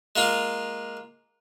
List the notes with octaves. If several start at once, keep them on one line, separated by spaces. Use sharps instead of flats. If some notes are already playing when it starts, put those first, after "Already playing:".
G#3 A#3 F4